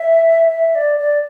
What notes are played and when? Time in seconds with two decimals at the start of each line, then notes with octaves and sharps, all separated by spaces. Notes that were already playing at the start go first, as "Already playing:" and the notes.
Already playing: E5
0.51 E5
0.75 D5
0.98 D5